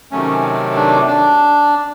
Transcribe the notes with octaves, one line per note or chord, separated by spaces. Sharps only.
C3 D#3 F#3 A3 C#4
D4
D4